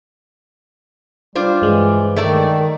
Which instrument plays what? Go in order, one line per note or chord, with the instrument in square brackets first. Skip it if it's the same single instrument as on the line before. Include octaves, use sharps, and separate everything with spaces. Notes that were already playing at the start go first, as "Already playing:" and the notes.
[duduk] G3 [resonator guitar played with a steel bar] D4 F4 C5
[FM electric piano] G2 G#3 [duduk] E3
[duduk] D#3 [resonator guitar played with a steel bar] A3 D5 A5